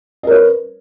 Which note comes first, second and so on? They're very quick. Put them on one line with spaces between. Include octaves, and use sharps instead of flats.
D#5 A#4 C#5 B4